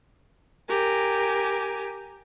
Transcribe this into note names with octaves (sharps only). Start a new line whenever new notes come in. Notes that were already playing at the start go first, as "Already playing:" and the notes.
G4 A#4 G#5